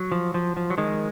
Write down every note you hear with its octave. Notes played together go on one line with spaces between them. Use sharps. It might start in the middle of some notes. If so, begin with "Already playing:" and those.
Already playing: F#3
F3
F3
F3
F#3
D#3 G#3